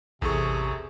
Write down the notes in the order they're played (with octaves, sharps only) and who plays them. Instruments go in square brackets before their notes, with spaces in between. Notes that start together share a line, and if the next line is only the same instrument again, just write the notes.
[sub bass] A1 [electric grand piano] E2 A4 C#6 [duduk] C3 [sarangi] G#4